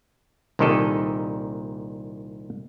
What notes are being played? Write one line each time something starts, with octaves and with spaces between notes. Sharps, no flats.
C2 A#2 D#3 G4 A4 D#5